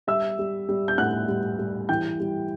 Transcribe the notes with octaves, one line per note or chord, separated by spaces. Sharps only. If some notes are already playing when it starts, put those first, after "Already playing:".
G3 E5 E6
G3
G3
G6
A2 F#5 F#6
G3
G3
E3 G5 G6
G3